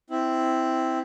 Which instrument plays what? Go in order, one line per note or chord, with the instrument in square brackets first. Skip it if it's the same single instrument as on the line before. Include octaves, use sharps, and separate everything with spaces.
[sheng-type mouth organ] C4 E4